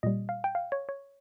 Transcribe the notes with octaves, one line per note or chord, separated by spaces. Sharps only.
A#2 G3 D#5
F5
G5
F5
C#5
C#5